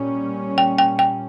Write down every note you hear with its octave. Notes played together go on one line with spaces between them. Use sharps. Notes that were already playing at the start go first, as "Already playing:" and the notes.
Already playing: A#2 G3 C#4
G5
G5
G5